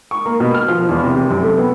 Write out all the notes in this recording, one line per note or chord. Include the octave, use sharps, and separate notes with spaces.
C#6
A#3
B2
F6
F3
E2
C3
C3
F#2
A3
B3